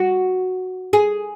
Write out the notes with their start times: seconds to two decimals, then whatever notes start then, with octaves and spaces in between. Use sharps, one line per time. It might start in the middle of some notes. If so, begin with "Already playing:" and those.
Already playing: F#4
0.93 G#4